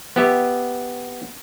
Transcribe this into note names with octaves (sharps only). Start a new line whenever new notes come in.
B3 G4 E5